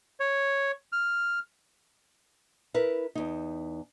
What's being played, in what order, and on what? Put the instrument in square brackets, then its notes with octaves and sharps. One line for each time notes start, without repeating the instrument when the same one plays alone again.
[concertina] C#5
F6
[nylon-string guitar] E4 A#4 B4
E2 D#4